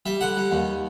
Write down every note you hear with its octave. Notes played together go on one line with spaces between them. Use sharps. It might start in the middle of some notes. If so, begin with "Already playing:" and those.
G3 E5
D3 F#5
G3
D#2